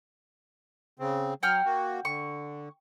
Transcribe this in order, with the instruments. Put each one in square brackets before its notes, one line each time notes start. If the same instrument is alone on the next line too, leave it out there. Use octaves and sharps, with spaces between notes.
[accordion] C#3 C4
[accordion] F#3 [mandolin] F#5 G5 F6
[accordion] A#3 F#4
[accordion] D3 [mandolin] C#6